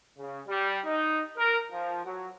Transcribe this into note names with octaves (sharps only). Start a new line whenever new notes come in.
C#3
G3
D#4
A#4
F3
F#3